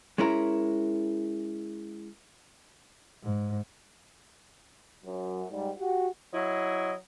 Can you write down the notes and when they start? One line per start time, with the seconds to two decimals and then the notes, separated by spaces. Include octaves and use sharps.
0.18 G#3 C#4 E4 A#4
3.24 G#2
5.04 F#2 F#3
5.50 G#2 G3
5.78 F#4 G4 F#5
6.33 F#3 E4 D#5